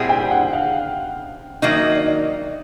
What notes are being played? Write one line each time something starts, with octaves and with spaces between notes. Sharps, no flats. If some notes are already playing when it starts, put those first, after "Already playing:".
Already playing: A#2 G3 C4 E4 G#4 F#5
G5
F#5
F5
D#3 F#3 A#3 D#4 E5
D5
D#5